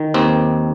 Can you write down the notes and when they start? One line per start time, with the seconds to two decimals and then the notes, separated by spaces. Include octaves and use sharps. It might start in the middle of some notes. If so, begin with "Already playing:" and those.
Already playing: D#3
0.14 D#2 C4